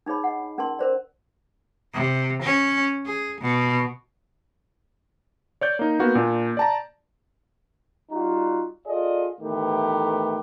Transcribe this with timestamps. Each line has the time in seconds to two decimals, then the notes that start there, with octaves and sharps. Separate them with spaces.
0.06 D4 D#4 G#4 C#5 B5
0.24 D#5 F#5
0.40 D4
0.58 C#4 D4 A#4 A5 C6
0.79 A#4 C5 D5
1.93 C3
2.42 C#4
3.06 G#4
3.41 B2
5.61 C#5 D5 G6
5.79 A#3 D#4
5.99 A#3 B3 F#4
6.15 A#2 D4
6.57 D5 A5 A#5
8.11 G3 D#4 F4 F#4
8.87 F4 G#4 A4 D5 D#5
9.41 A2 D#3 E3 A3 B3 G4